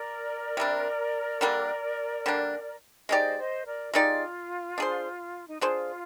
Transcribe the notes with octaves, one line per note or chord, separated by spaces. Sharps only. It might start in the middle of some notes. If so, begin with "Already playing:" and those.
Already playing: A#4 D5
C3 G3 D4
D3 G3 A#3 D4
D3 G3 A#3 D4
G#3 D#4 G4 C5 D5 D#5
C5 D#5
A#4 D5
G#3 D#4 F4 G4 D5
D4 G#4 C5
D#4
D4 F4 G#4 C5